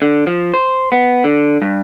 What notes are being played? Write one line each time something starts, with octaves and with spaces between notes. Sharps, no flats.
D3
F3
C5
B3
D3
G2